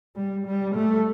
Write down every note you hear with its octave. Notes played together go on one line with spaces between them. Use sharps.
G3
G3
A3